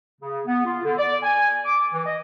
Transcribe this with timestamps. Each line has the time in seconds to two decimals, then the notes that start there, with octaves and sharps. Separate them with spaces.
0.21 C#3
0.46 B3
0.65 F4
0.84 D3
0.98 D5
1.23 G#5
1.65 D6
1.93 E3
2.06 D#5